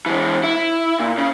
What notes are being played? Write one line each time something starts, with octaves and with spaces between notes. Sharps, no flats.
E3 G#3
E4
A#2
C#3